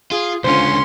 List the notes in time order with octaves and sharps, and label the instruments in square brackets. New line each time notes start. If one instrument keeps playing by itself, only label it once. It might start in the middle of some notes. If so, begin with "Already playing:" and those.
[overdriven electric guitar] F4 [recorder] G#4
[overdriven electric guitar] C#2 D3 [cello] C#4 [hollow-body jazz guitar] F4 C5 [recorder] C6